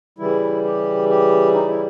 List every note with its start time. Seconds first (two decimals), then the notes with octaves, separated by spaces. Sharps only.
0.19 C#3 E3 G3 E4
0.64 G4
1.09 G4
1.54 D#4
1.68 E4